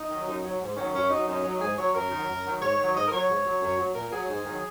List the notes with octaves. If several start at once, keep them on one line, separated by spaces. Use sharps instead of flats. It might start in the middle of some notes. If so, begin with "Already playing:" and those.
Already playing: D#4
D#3 F#3
F#2
F#3
G#2
D#3 F#3 C#4
F#2 C#4
F#3 D#4
F#2 D#4
F#3
G#2 G#4
F#3 C#5
F#2 A#4
D#3 F#3
F#2
D#3 F#3
G#2 C#5
D#3 F#3
G#2 D#5
A#4
F#3 C#5
G#2
F#3
F#2
F#3
A#2 A#4
F#3 G#4
G#2
D#3 F#3